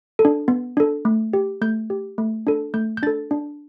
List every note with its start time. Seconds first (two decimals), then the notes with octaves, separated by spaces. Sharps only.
0.19 A4
0.25 D4
0.48 B3
0.77 D4 A4
1.05 A3
1.33 G4
1.61 A3 G6
1.90 G4
2.18 A3
2.47 D4 A4
2.74 A3 G6
2.97 G6
3.03 D4 A4 A6
3.31 D4